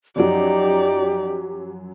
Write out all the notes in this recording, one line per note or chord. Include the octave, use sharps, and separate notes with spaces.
F#2 F3 F#3 D#4 G4 D5